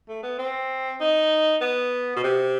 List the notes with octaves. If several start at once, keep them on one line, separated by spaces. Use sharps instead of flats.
A3
B3
C4
D#4
B3
B2
C3